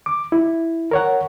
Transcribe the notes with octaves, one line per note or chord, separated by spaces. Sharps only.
D6
E4
A#4 C#5 F#5